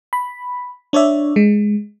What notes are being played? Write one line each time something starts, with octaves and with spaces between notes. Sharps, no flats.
B5
D4 C#5 D5 E5
G#3